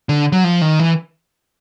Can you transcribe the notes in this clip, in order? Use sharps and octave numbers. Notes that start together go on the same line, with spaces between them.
D3
F#3
F3
D#3
E3